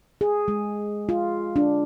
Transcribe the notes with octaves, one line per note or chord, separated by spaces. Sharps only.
G#4
G#3
F4
D4